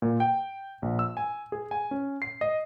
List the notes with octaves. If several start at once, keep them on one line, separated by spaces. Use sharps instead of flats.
A#2
G5
A#1
E6
G#5
G#4
G#5
C#4
C7
D#5